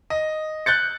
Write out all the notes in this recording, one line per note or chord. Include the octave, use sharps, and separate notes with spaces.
D#5
F#6 G6 A6 C#7